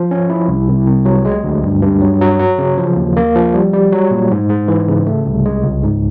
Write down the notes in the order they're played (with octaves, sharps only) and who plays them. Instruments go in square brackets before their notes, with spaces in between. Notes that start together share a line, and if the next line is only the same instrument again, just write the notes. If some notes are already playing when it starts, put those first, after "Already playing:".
Already playing: [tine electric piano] F3
C#4
E4
C2
C2
C2
F#3
G#3
D2
G2
G2
F#3
F#3
F#3
C#3
F3
D#2
A#3
F3
G3
G3
F#3
A#2
G#2
G#2
E3
C#3
A3
C2
G#3
C#2
G#2